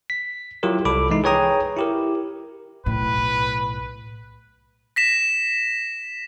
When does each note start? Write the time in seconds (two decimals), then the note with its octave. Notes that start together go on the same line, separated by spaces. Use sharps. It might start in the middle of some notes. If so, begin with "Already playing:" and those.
0.10 B6
0.63 F#3 E4 F4 G4 A#4
0.85 C2 A4 B5 D6
1.10 E3 G#3 D#4 E4
1.24 G#4 B4 C#5 G5 A#5 D#6
1.76 E4 G4 A#4
2.86 B1 A2 B4
4.96 A#6 B6 E7